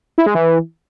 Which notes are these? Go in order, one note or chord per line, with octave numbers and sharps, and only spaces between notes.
E4
G#3
E3